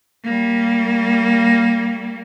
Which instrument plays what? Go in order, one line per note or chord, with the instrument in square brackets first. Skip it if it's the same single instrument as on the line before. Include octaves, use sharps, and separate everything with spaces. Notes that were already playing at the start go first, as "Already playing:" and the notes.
[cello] G3 A#3